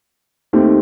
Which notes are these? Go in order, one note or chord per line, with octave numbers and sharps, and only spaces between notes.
D#2 D#3 A3 C4 G4